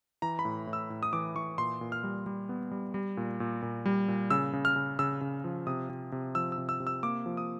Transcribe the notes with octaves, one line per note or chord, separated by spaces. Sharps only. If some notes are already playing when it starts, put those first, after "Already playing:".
E3 A#5
B5
A2
A2
E6
A2
D#6
E3 D6
E3 C#6
A#2 C6
A#2
F6
G3
G3
B3
G3
G3
A#2
A#2
A#2
G3
A#2
C#3 E6
C#3
F6
C#3
C#3 E6
C#3
F3
C3 D#6
C3
C3
F3 E6
E6
C3
E6
C3
E6
A#3 D6
F3
D#6